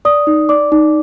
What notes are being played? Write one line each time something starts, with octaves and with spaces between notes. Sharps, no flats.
D5 D#6
D#4
D5 D6
D#4